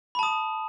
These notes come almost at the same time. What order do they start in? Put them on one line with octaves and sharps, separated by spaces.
B5 A5 D#6